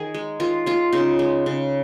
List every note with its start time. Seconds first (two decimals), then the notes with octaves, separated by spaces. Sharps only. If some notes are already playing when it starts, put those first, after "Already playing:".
Already playing: D#3 G#4
0.14 G#3
0.40 D#3 F4
0.66 G#3 F4
0.93 C#3 D#4
1.19 G#3
1.46 C#3